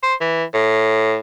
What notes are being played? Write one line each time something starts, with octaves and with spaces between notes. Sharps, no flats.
C5
E3
A2